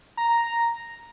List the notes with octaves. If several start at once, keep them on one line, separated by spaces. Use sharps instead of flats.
A#5